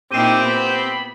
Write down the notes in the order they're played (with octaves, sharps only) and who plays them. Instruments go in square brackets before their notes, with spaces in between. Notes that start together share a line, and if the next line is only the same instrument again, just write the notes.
[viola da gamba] A#2 D#4 E4 [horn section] C4 G4 [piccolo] D#7
[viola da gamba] B3 [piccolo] B5